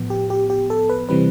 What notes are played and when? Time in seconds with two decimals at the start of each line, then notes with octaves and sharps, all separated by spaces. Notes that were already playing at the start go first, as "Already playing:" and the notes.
Already playing: A2 F3 B3
0.10 G4
0.30 G4
0.50 G4
0.70 A4
0.90 B4
1.09 C3 E3 G3 C4 B4